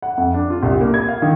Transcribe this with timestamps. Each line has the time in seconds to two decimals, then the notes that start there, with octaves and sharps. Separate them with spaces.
0.02 F#5
0.18 F2
0.34 D4
0.50 F4
0.63 C2
0.81 A#3
0.94 G#6
1.08 F5
1.22 D#3